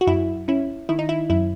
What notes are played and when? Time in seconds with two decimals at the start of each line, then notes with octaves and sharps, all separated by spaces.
0.01 F#4
0.07 F#2 E4
0.48 C#4 E4
0.89 D#3 E4
0.99 D#4
1.09 E4
1.30 F#2 E4